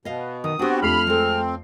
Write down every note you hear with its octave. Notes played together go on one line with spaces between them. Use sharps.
B2 D#5 F5
D#3 D#6
B3 C4 D4 F#4 G4
F2 A3 B5 F6 C7
G#3 C4 A4